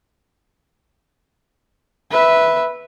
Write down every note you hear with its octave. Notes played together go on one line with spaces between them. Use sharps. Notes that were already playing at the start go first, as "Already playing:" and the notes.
B4 E5